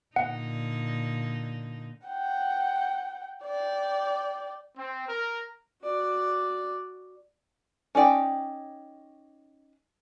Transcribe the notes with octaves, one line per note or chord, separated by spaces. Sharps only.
A#2 D3 D#4 F#5
F#5 G5
D5 G5
C4
A#4
F#4 D5
C#4 D#4 D5 G5